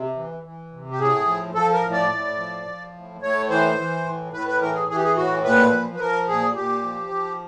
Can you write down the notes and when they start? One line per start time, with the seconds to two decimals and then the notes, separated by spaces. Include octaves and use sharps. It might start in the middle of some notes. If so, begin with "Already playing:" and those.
Already playing: C3
0.16 E3
0.43 E3
0.72 C3
0.91 G4
0.99 A2 G#4
1.27 F3
1.54 F3 A4
1.74 A#4
1.83 A2
1.92 D5
2.11 A2
2.38 F3
2.66 F3
2.94 A2
3.21 A2 C#5
3.49 E3 C5
3.77 E3
4.05 A2
4.33 A2 B4
4.47 B4
4.61 E3 A#4
4.74 G#4
4.89 E3 G#4
4.96 G4
5.04 G#4
5.16 A2 F#4
5.44 A#2 B4
5.72 F3
5.95 B4
6.00 F3 A#4
6.27 A#2 G#4
6.55 A#2 G4
6.83 F3
7.11 F3